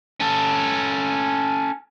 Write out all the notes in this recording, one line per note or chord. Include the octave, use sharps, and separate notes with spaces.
C#4 A4